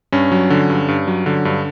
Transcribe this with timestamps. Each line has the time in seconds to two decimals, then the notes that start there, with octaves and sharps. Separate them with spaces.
0.12 G2 C#4
0.32 F#3
0.50 D3
0.70 G2
0.88 G2
1.07 F#3
1.26 D3
1.45 G2